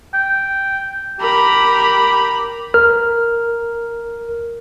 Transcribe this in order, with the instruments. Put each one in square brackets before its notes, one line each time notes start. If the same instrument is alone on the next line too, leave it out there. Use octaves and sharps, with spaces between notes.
[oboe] G5
[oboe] G4 [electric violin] A#4 B5
[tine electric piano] A#4 F6